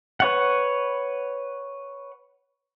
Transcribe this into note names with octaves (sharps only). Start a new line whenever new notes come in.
B4 C#5 F#5